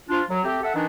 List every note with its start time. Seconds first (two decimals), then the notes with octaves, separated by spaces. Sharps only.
0.09 F3 D4 F4
0.29 F#3
0.44 A3 C4 G4
0.62 A4 E5 F#5
0.74 D#3 E3 D4 D#4